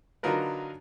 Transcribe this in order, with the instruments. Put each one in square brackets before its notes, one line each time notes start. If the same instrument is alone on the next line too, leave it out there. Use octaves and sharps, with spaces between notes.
[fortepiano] D3 F#3 D#4 F4 A#4 B4